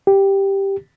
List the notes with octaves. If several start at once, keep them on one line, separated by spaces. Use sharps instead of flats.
G4